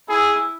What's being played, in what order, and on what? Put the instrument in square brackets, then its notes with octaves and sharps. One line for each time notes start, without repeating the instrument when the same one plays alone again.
[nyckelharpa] E4 [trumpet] G#4